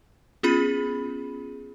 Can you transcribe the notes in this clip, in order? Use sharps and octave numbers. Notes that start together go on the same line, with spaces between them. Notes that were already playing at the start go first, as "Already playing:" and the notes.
B3 C#4 F4 G#4 B5